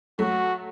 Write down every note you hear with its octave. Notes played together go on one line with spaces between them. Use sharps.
F#3 A3 F#4